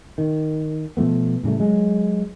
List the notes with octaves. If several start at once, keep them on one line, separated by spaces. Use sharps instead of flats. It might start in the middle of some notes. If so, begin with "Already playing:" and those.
D#3
B2 F3 A3 B3
A2 C#3 G3 A3
F#3 G#3